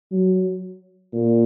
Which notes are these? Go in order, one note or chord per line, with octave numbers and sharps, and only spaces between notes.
F#3
A#2